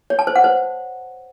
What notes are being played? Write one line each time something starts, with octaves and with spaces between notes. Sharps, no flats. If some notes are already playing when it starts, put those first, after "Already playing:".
C#5
A5
C5
F#5
C5